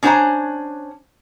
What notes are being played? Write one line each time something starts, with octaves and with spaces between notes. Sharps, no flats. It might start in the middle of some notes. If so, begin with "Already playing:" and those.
C#4 D4 C5 F#5 G#5 A#5